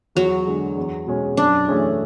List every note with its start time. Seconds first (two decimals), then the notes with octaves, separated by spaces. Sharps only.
0.15 E2 F#3
0.47 D3 G#3
0.77 E2
1.07 B2 G#3 C#4
1.37 F#2 D4
1.68 E3 A3 C#4 G#4